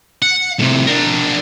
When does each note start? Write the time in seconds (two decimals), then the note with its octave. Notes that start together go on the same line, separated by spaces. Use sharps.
0.22 F#5
0.59 A2 C3
0.87 D4 A#4